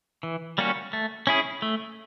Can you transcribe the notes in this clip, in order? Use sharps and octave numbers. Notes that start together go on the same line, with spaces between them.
E3
G3 A#3 C#4 F#4
A3
C#4 E4 G#4
A3